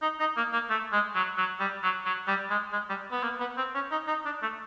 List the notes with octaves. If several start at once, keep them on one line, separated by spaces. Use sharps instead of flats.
D#4
D#4
A#3
A#3
A3
G#3
F#3
F#3
G3
F#3
F#3
G3
G#3
G#3
G3
B3
A#3
B3
C4
C#4
D#4
D#4
D4
A3